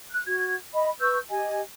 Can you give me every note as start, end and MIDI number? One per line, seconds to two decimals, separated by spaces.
0.11 0.22 90
0.26 0.55 66
0.26 0.55 92
0.74 0.90 75
0.74 0.90 76
0.74 0.90 83
1.00 1.18 71
1.00 1.18 85
1.00 1.18 88
1.00 1.18 91
1.29 1.61 67
1.29 1.61 75
1.29 1.61 80